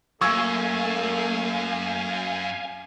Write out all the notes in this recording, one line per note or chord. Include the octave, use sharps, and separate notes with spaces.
F#2 A3 A#3 F5 G#5 C#6 E6 G#6